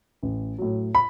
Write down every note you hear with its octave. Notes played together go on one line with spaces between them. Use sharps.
A1
A2 F#3
B5